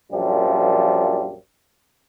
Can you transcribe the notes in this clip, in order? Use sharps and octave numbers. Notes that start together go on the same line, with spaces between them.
A#1 F#2 F3 G3